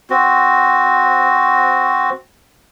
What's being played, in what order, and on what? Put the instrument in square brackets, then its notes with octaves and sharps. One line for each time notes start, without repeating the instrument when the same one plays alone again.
[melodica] C4 F#4